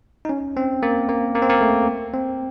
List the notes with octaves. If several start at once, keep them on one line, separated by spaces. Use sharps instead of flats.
D#4
C#4
C4
A#3
A#3
A#3
C4
A#3
A3
C4